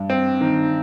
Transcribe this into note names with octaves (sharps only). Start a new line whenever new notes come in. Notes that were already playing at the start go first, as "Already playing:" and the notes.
Already playing: G2
C4
D#3